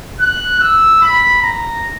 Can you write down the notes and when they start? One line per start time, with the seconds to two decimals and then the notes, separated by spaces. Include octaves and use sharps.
0.21 F#6
0.60 E6
1.01 B5
1.42 A#5